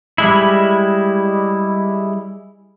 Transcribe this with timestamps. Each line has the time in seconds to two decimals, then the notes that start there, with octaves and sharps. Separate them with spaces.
0.18 G3 G#3 E4